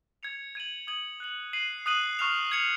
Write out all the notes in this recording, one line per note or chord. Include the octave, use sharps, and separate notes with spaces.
G#6 C#7 F7
G#6 D#7 F#7
D#6 G#6 D#7 F#7
F#6 C#7 F#7
F#6 C7 D#7 F#7
D#6 F#6 C7 D#7 F#7
C#6 F6 C7 F7
G#6 C#7 F7